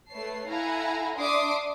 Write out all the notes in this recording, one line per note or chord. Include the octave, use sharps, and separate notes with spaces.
A3 B4 C#5 A5 C7
E4 A4 F5 F#5 G#5 A#5
D4 E5 C6 D6 D#6 C7